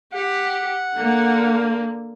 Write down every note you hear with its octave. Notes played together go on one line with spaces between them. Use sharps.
G4 F#5
D3 A#3